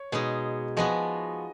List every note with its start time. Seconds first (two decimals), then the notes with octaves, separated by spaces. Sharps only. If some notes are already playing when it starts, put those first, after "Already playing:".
Already playing: C#5
0.12 B2 G#3 D#4 G#4
0.77 F3 G#3 B3 F#4 D#5